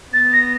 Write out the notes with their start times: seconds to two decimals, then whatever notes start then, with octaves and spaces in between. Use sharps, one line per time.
0.13 B3 A6
0.33 A#6